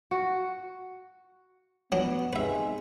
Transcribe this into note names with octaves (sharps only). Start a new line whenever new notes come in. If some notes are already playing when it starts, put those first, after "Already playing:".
F#4
F#3 B3 D4
C3 D#3 G#3 B4 E5